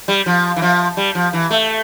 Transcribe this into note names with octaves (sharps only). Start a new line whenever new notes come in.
G3
F3
E3
F3
G3
F3
E3
A3